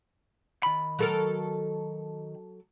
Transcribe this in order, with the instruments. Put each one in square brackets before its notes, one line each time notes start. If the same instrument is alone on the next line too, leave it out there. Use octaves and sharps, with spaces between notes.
[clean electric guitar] D#3 B5
[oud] F#3 A4 A#4